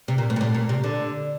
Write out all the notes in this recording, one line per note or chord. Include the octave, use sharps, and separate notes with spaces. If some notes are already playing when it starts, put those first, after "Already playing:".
C3
A#2
A2
A#2
A2
A#2
C3
D3